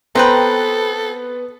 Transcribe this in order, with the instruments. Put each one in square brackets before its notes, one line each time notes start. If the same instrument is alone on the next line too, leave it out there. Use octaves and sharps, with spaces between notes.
[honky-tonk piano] B3 [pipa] C4 [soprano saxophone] A4 [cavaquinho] B4 G5 A#5